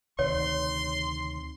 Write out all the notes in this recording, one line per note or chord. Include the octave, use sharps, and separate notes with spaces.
D2 C3 D#3 C#5 C6